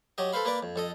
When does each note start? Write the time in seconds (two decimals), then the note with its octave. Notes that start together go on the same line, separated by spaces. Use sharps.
0.18 F#3 G4 D#5
0.33 A4 B4 C5 F5 B5
0.45 A#3 B4 D5 D6
0.63 F2
0.76 F2 A4 D#5